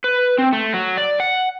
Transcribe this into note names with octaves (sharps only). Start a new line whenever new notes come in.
B4
C4
A3
F#3
D5
F#5